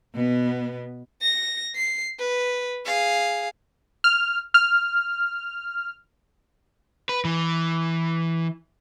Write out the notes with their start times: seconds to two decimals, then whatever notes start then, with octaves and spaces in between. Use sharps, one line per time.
0.15 B2 B3
1.22 A#6
1.75 C7
2.19 B4
2.86 G#4 F5
4.04 F6
4.54 F6
7.09 B4
7.25 E3